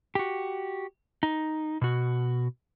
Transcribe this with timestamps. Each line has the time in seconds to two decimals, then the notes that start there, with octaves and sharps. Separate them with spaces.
0.15 F#4 G4
1.23 D#4
1.81 B2 F#4